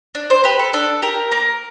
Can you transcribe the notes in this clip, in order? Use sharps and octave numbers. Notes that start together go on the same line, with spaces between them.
D4
C5
G4 B4
A4
D4 A4
G4 A#4
A#3 A#4